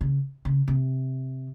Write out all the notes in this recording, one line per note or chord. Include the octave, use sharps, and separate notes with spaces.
C#3
C#3
C3